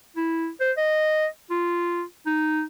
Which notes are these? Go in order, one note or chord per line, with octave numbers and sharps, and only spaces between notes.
E4
C5
D#5
F4
D#4